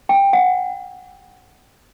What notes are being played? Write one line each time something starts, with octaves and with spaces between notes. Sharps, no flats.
G5
F#5